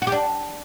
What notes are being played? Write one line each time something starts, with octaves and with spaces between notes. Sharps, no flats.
F#4
G4
D4